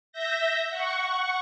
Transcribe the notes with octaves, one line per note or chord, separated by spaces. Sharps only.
E5 G6 A#6
F#5 C#6